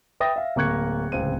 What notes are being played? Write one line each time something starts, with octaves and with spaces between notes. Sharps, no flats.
B4 E5 G5 D#6 A6 A#6
E5 F5
D1 A#3 C#6 F#6 G#6 C#7
D1 C#2 C4 D#7